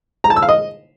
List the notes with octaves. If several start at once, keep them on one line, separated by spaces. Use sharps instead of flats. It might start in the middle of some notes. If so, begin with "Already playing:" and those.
A#5
A5
E6
F5
D#5